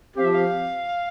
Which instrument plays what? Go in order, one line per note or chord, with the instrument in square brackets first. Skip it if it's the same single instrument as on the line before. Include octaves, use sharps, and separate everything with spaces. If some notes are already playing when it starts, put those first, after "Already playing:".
[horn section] F3 C4 G4 [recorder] F5
[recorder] E5
F5